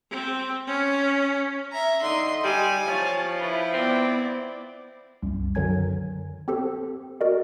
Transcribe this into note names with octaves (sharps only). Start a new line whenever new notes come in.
C4
C#4
E5 A#5
D3 D#4 D#5 C6
G3 G#5
F3 C#5 A5
E4 B4
B3 C4 D5
C2 F#2
F#2 D3 D#3 F#3 G#5 G#6
C4 G4 A4 C5
F#4 A#4 D5 D#5